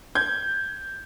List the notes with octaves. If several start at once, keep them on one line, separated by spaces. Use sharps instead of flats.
G6 G#6